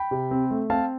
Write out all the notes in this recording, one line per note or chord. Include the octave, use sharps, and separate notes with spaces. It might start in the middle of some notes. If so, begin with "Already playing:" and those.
Already playing: G5 B5
C3
C4
A3
C4 F5 A5